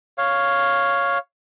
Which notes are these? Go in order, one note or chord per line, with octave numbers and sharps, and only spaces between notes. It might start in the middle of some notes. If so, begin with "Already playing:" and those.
C#5 F5